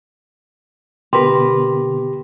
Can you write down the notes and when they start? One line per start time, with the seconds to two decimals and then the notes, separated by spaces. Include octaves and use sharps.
1.13 B2 D3 B3 G4 A#4 B4 C6